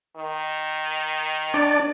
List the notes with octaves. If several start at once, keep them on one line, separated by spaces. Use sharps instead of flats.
D#3
D4 D5